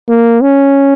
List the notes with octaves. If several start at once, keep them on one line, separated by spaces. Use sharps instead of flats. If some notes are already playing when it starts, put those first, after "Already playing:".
A#3
C#4